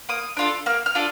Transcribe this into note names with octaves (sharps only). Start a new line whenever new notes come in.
A#3 D#6
D4 F4 A4
A#3 F6
F6
D4 F4 A4